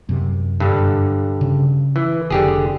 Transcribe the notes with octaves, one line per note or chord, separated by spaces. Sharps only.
F#2 C3
G2 D3
C#3 C#4
E3
F1 D3 G4 G#4